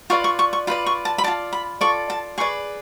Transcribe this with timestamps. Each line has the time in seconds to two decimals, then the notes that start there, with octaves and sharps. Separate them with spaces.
0.10 F4 B4 D5 C#6
0.24 C#6
0.39 C#6
0.53 C#6
0.67 F4 B4 D5 B5
0.86 C#6
1.05 A5
1.18 B5
1.24 F4 A4 D5 A5
1.53 B5
1.81 F4 A4 D5 C#6
2.10 A5
2.38 G#4 B4 D5 C#6